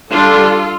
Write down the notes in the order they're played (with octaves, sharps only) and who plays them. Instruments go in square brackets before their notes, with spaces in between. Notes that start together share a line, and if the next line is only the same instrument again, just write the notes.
[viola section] G3 D4 F4 A4